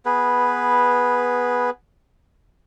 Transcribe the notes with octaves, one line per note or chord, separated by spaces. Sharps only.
B3 G#4 B4